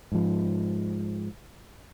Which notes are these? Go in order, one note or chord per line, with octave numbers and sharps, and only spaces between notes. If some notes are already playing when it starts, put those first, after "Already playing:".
G#2 F3